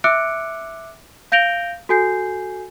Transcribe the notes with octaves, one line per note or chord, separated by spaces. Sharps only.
E5 D6 E6 F#6 C#7 D7
F5 G6 A#6 D7 F7 G7
F#4 A4 G#5 G6 C7